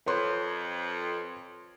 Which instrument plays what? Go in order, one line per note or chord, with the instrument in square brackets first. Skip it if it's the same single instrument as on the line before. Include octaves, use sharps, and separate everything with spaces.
[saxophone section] F2 [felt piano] B4 C#5 C6